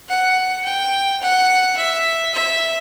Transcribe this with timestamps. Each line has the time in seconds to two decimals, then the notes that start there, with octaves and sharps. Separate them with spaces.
0.09 F#5
0.65 G5
1.22 F#5
1.77 E5
2.33 E5